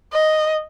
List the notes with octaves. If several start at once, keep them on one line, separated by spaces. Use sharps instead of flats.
D#5